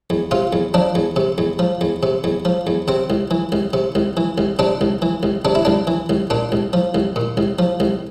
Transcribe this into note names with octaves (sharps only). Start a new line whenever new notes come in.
E2
C3 F4
E2
F3 D4
E2
C3
E2
F3
E2
C3
E2
F3
E2
C3 C4
C2
E3
C2
C3
C2
E3
C2
C3 D4
C2
E3
C2
C3 D4
E4
C2 D4
E3
C2
A#2 D4
C2
F3
C2
A#2
C2
F3
C2